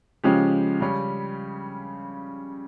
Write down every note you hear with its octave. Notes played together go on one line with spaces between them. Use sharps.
C#3 F3 G#3 C#4 G4
C#3 G3 C#4